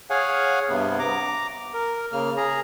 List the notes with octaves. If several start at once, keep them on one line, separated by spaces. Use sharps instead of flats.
G#4 C#5 F5 F#5 G#5
G2 C3 B3
A#5 D6
A#4
C#3 A#3 F6
G#4 A#5